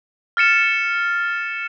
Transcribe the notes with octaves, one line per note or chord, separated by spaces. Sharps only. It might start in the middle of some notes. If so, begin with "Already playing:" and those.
F6 A6 C#7 E7